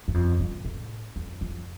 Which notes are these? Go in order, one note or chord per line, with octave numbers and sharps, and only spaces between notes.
G2
F2
G2
A2
F2
F2